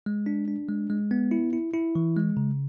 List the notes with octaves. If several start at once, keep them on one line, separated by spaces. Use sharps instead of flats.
G#3
D4
D4
G#3
G#3
B3
E4
E4
E4
E3
G#3
C#3